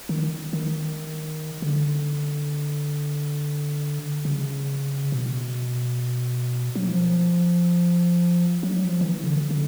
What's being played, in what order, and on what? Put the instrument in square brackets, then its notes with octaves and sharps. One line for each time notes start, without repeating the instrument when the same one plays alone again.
[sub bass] D#3
D#3
D3
C#3
B2
F#3
F3
F#3
F3
D#3
E3
C#3
D3
D3